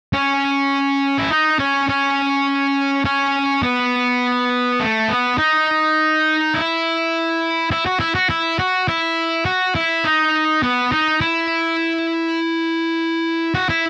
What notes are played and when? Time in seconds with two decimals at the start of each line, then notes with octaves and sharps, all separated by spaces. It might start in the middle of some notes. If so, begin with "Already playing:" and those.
0.13 C#4
1.18 E4
1.31 D#4
1.59 C#4
1.89 C#4
3.05 C#4
3.63 B3
4.80 A3
5.09 B3
5.38 D#4
6.54 E4
7.72 E4
7.86 F#4
8.00 E4
8.15 F#4
8.30 E4
8.59 F#4
8.88 E4
9.46 F#4
9.75 E4
10.05 D#4
10.63 B3
10.92 D#4
11.21 E4
13.55 F#4
13.69 E4